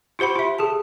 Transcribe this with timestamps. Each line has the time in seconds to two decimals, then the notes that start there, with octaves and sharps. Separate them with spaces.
0.19 F4 G4 C5 F#5 B5
0.36 F4 E5
0.58 G#4 A4 A5